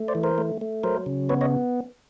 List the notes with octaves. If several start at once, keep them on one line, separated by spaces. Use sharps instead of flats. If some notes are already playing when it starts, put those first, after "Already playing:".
Already playing: A3
C5 D5
E3
A#4 C5
A3
A3
F#3 A#4 C5
C#3
B3 B4 C#5
C#5 D#5